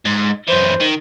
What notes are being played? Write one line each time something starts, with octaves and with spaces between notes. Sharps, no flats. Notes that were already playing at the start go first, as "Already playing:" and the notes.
G#2
F#2 E3 C5
D#3